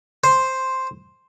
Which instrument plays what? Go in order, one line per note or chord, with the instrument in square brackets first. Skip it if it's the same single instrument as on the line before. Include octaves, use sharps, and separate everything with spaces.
[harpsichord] C5